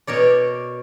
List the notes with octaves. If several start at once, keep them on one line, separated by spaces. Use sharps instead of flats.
B2 A#4 C#5 D5